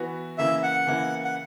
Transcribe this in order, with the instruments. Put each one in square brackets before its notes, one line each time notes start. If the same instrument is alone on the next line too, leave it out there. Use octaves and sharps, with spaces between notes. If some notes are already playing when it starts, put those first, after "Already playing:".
Already playing: [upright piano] E3 B3 F#4
[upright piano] C#3 E3 A#3 E4 [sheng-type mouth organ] E5
[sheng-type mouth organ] F#5
[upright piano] C#3 E3 A#3 E4
[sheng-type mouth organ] F#5